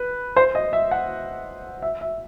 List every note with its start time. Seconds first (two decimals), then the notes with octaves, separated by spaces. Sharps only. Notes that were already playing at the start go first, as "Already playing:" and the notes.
Already playing: B4
0.36 C5
0.55 D#5
0.73 E5
0.91 F#5
1.82 E5
2.01 E5